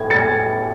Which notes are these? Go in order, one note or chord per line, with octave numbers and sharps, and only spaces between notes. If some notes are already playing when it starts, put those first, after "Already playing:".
Already playing: A2 G#6
A6 C#7